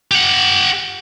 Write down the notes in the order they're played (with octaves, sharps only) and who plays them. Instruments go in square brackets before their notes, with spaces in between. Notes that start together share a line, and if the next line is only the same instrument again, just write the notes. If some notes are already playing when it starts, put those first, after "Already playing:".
[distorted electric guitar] G4 F#5